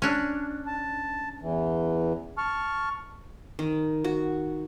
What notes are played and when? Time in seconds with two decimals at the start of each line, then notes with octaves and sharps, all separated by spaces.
0.02 C#4 D4
0.67 A5
1.42 E2 E3
2.38 A5 C#6 F6
3.59 D#3
4.04 F#4